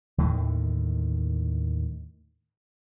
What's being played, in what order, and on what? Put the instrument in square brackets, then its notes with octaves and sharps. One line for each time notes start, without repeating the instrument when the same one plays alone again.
[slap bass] D#2 A2 D3 D#3